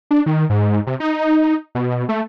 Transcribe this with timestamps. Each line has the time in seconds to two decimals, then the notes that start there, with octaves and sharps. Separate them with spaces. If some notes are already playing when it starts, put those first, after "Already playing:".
0.11 D4
0.26 D#3
0.50 G#2
0.87 C3
1.00 D#4
1.75 B2
2.09 A3